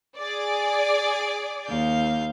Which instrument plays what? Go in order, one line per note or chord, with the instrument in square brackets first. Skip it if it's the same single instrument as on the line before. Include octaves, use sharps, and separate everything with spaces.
[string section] G#4 D5
[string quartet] D#2 F5 G6